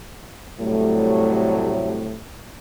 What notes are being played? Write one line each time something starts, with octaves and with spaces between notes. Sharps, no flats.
A2 C3 F#3 G3 A3